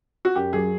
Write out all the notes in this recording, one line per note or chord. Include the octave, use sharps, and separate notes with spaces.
F#4
F#2 G4
F#3 G#4